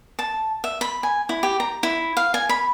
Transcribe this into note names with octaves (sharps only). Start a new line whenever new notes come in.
A5
E5
B5
G#5
E4
G4
A#5
E4
F5
G#5
B5